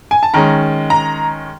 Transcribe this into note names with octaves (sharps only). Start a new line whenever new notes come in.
G#5
A5
D#3 G#3 C#4 A#5
A#5